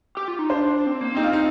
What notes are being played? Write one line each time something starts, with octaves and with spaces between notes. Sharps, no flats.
G4
F4
D#4
D4 C5
C4
A#3
C4 D#4
F4
D#4